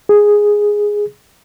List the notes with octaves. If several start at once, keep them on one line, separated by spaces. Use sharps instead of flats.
G#4